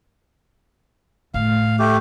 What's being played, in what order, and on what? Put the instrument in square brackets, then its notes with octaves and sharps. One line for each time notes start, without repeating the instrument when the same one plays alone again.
[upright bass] A2 [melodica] F5
[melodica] A3 G4